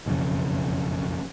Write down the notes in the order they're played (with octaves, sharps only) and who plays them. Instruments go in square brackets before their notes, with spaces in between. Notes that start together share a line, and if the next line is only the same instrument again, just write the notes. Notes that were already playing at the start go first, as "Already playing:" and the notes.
[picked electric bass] F#1 B1 F2 C#3